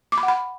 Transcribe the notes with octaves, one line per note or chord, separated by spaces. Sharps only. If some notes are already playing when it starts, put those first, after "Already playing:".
D6
B5
F#5
B5